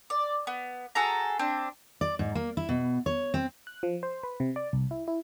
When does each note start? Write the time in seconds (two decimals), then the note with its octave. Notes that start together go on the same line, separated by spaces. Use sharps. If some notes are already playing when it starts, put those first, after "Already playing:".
0.10 D5
0.47 B3
0.95 F#4 G#4 A4 A#5
1.39 C4 D4
2.01 D5
2.19 G#2
2.35 A#3
2.57 E4
2.69 B2
3.06 C#5
3.34 C4
3.67 F#6
3.83 F3
4.03 C5
4.23 B4
4.40 C3
4.56 D5
4.73 C2
4.91 E4
5.08 E4